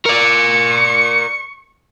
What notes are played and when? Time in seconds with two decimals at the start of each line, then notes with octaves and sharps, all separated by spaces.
0.06 A#4 D5 C#6